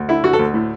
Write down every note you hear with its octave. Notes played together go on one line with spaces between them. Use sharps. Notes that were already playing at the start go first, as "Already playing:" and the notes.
Already playing: D2
D3 E4
D3 F#4
A4
D2
A2